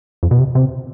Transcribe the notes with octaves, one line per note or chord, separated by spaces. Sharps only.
F2
B2
C3
C3